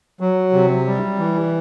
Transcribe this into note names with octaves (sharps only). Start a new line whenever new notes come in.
F#3
C3
G3
E3